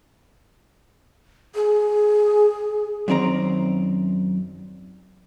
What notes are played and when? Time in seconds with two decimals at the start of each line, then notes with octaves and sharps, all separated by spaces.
1.55 G#4
3.08 F#2 D#3 C4 D5 A#5